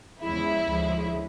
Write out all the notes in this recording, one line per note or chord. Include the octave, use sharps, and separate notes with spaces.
E2 C#3 F3 G#3 E4
D2 C#3 F3 G#3